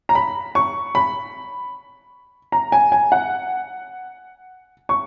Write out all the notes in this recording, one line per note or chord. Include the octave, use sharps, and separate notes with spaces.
A#5
B5
C#6
B5
A#5
G#5
G#5
F#5
C#6